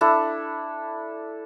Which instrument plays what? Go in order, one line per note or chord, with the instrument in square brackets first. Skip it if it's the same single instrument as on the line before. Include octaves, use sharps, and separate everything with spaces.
[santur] D4 E4 A4